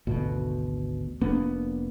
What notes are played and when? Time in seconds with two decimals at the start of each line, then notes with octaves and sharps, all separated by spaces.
0.07 G#1 D2 B2
1.21 F1 A#3 B3 D4